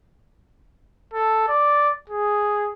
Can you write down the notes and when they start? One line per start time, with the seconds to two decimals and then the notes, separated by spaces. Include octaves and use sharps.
1.14 A4
1.48 D5
2.10 G#4